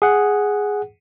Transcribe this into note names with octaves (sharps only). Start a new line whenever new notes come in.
G#4 F#5